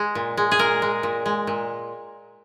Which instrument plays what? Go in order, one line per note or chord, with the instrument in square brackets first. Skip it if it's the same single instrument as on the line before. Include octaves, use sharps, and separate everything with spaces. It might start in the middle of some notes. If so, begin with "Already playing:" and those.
Already playing: [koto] G#3
A#2
G#3
G#4
A#2 A#4
G#3
A#2
G#3
A#2